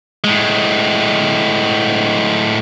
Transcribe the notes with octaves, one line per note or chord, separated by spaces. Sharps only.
A2 G#3